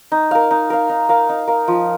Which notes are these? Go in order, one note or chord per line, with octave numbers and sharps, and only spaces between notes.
D#4
A#4 F5
D#4
A#4 F5
D#4
A#4 F5
D#4
A#4 F5
F3